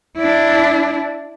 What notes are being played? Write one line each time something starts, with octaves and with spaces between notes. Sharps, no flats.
D4 E4